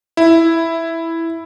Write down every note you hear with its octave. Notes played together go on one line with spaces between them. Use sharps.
E4